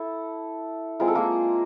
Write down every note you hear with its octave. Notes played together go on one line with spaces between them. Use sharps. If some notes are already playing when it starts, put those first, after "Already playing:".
Already playing: E4 A4
G#3 C4 F4 A#4
A4
A#3 A#4